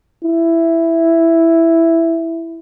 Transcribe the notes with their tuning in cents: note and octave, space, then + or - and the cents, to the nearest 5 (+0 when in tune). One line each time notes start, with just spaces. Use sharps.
E4 +5